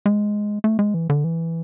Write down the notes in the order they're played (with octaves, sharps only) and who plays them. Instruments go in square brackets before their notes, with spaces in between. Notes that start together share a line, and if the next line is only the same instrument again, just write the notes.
[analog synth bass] G#3
A3
G#3
E3
D3
E3